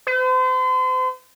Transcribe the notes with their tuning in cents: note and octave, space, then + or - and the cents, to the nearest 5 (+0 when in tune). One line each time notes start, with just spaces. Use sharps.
C5 -40